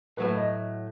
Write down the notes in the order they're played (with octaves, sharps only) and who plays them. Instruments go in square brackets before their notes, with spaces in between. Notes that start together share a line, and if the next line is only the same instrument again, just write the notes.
[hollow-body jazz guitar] A2 F#3 A3 [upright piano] B4
[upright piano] D#5